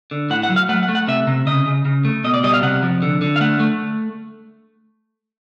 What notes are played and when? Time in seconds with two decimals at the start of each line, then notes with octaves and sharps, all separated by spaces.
0.11 D3
0.30 A2 F#5
0.43 F#5
0.50 F#3
0.56 F5
0.69 A3 F#5
0.83 F#5
0.89 A3
0.95 F#5
1.08 C3 E5
1.27 C3
1.47 C#3 D#5
1.66 C#3
1.85 C#3
2.05 A3
2.24 B2 D#5
2.34 D5
2.43 G3 D#5
2.53 F5
2.63 C3 F#5
2.83 F3
3.02 D3
3.21 D3
3.36 F5
3.41 A3 F#5
3.60 A3